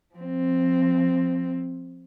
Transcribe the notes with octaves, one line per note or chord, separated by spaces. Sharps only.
F3 C4